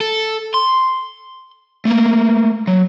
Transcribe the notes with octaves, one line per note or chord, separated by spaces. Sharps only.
A4
C6
A3 A#3
F#3